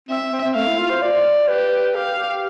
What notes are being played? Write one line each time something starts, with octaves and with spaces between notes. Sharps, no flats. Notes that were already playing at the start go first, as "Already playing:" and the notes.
C4 E5
C4
C4
A3 F5
E4
F4
C5
D5
G4 B4
G4 F5
G4